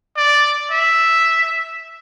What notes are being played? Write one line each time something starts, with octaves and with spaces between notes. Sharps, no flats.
D5
E5